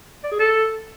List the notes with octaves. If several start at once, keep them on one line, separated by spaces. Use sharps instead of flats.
D5
G#4
A4